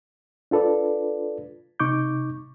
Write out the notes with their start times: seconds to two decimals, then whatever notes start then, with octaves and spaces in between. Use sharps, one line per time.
0.51 D4 F4 A4 B4 D5
1.80 C3 D#4 C#6 D6 G6